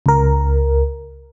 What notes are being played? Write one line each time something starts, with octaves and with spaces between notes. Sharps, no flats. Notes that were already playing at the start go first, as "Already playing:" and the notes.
C#2 A#4